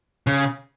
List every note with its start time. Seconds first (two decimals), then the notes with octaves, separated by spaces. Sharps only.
0.27 C#3